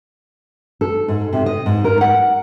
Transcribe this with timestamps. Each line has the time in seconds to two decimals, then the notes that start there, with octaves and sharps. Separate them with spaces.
0.81 A4
1.08 G#2
1.33 C3
1.46 D#5
1.66 G#2
1.84 A#4
2.01 F#5